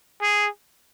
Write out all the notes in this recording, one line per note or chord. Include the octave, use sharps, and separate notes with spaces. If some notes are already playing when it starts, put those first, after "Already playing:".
G#4